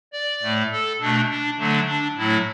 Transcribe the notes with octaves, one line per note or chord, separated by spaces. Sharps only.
D5
A2 A3
A4
B2 A3 D4
D4
D3 F#3 A3 D4
D4
A2 F#3 A3 E4